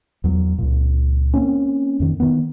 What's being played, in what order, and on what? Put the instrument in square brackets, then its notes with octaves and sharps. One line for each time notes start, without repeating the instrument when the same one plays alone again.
[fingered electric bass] E2 F#3
C#2 A#2
A#3 C4 C#4
F2 D#3
D#3 B3